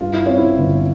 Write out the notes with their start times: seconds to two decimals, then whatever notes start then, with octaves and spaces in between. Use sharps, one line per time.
0.01 G2 F4
0.14 E4
0.26 C4 C#4
0.38 E4
0.58 G1